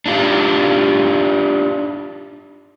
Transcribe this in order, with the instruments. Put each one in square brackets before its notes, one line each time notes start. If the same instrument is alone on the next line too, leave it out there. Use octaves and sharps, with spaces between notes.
[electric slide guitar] D4 D#4 F4 G4 D5